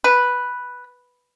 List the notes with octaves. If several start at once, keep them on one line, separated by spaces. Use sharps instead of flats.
B4